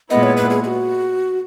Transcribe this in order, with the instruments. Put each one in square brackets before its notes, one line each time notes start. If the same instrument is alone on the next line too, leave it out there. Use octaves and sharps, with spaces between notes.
[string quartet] A#2 G#3 B3 E4 [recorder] D#5
[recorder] C#5
B4
G#4
G#4
F#4